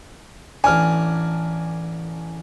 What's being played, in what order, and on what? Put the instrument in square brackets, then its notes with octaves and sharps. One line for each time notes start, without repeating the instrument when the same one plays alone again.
[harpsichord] A1 D4 [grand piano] G#5 F6